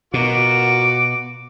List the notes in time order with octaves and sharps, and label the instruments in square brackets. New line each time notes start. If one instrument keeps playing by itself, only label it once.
[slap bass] B2 [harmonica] F4 F#4 A#4 [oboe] D6